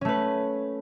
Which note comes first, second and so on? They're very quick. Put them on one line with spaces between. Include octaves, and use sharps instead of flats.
C#4 A3 B4